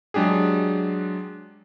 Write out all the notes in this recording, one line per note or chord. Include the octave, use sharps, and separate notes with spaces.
F#3 G#3 D4 G4 G#4